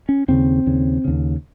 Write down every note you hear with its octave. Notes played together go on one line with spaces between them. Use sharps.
C#4
D#2 C#3 C4
D#2 C#3
D#2 C#3